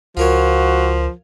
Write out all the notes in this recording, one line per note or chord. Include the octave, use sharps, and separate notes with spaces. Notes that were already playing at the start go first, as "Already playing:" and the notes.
C#2 F3 F4 F#4 A#4 C#5